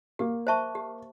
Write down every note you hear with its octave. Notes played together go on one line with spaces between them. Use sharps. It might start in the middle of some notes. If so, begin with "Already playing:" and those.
A#3 G4
C5 E5 A5 C#6
G4